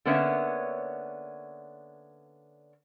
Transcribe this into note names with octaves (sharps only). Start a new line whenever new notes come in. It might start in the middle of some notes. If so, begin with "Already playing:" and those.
D3 A#3 B3 C#4 C#5 E5